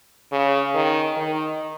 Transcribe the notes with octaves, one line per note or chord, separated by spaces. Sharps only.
C#3
D#3
D#3